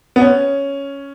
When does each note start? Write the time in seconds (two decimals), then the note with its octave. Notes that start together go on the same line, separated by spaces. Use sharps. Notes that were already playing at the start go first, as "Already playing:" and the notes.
0.16 B3
0.21 C#4